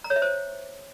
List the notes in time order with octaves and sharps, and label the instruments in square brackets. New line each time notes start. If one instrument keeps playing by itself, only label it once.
[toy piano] A#5
C#5
E5
C5